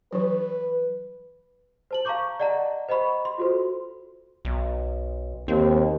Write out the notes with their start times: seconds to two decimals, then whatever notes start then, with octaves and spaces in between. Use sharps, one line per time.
0.13 E3 F#3 B4
1.91 C5 A5 F#7
2.05 F5 A5 A#5 C#6 D6 G6
2.40 D5 D#5 F#5 A5 A#5
2.89 C5 D#5 F#5 B5 C#6
3.25 C6
3.38 F4 F#4 A4 C5
4.45 B1
5.48 D#2 C4